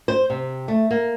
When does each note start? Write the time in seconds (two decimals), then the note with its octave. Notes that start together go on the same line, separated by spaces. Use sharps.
0.08 C5
0.30 C3
0.68 A3
0.91 A#3